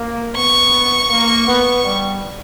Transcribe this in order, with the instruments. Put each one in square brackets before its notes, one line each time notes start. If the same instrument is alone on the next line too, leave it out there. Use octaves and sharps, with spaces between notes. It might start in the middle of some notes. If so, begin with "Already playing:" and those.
Already playing: [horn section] A#3
[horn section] B3 [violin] C#6
[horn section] A#3
B3
G3